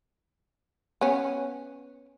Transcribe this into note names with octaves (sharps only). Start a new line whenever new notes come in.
B3 C#4